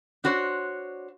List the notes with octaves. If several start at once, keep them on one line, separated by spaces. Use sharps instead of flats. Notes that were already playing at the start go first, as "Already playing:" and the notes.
D4 F#4 C5 C#5